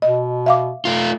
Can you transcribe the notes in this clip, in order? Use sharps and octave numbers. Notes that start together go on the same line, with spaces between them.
B2 D#5
E5 F5 D6
A3 F4